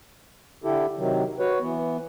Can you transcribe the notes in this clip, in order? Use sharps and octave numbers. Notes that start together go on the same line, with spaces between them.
D3 E4 G4 A4
C3 D#3 F#3
F#4 B4 C#5
E3 B3